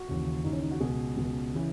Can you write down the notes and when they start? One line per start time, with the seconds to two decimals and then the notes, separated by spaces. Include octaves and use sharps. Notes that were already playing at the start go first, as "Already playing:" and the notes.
Already playing: F#4
0.08 D#2 C#3 E3
0.44 D#2 C#3 E3 D#4
0.53 C#4
0.62 D#4
0.71 F#4
0.80 C#2 B2 G#4
1.17 C#2 B2
1.55 C#3 E3